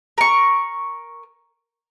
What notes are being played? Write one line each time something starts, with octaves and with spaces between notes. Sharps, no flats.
A#4 C#6